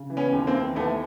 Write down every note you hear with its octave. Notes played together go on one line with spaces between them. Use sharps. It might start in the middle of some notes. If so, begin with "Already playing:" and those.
Already playing: C#3
E3
B3 C#4
D#2
A#3 C4
E3
D#2 A3 B3